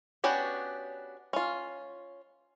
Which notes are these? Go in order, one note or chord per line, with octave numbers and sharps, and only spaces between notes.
B3 C#4 D4 F#4 G4
C#4 F4